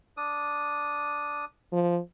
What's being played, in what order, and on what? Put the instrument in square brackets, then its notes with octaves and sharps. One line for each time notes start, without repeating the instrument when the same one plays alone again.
[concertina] D4 D#6
[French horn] F3